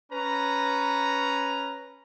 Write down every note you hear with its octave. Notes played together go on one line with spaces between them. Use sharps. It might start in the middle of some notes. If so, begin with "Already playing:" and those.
C#4 B4 A#5